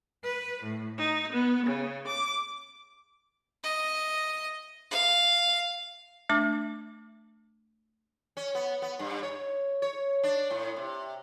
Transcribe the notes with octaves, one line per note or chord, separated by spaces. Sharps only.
B4
A2
D#4
B3
C#3
D6
D#5
F5
A3 D4 D6
C#4
B3
B3
G2
C#5
C#5
D4
A2
C3